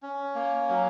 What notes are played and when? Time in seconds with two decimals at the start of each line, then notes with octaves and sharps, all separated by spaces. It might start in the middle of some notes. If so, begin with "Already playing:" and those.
0.03 C#4
0.35 A#3
0.69 F#3